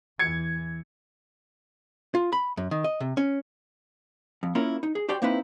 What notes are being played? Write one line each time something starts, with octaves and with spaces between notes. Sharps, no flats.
E2 E3 G#6 C#7
F4
B5
F#2
D#3
D#5
C3
C#4
F2
A#3 C#4 E4 F4 A#4
D#4
G#4
F#4 G4 C5 D5 G5
A#3 C4 D#4 E4 B4